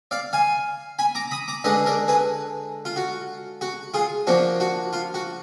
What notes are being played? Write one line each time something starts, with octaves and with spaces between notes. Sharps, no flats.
D5 F5
F5 G#5
G#5 B5
A#5 D6
B5 D#6
A#5 D6
D3 G#3 D4 B4 D#5
A#4 D5
G#4 B4
F4
F#4
F#4
F4 G#4
F3 A#3 D4 F#4
F#4
F4
F#4